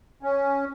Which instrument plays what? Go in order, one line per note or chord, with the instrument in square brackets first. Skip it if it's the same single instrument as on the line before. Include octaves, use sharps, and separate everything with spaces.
[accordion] C#4